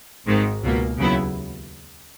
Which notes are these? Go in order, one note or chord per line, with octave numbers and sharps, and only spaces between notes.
G#1 G#2 D#3 G#3
C#2 B2 A#3
D#2 C#3 F#3 B3 E4